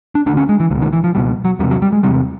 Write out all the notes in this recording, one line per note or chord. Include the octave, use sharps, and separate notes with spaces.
D4
D2 D3 D4
C#4
G#3
E3
C#2 B2 D3
D#3
E3
F3
C#2 B2 G3
F#3
E2 C3 G3
F#3
G3
G#3
E2 C3 G3